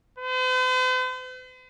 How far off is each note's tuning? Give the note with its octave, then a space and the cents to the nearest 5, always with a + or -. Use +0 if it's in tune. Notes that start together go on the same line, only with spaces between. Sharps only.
C5 -45